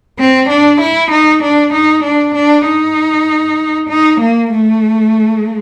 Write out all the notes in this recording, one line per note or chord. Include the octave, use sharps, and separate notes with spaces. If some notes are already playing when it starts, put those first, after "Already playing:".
C4
D4
E4
D#4
D4
D#4
D4
D4
D#4
D#4
A#3
A3